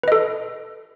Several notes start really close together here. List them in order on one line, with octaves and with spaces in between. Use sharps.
B4 D#5 A4